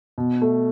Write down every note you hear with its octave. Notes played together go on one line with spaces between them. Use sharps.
B2
A3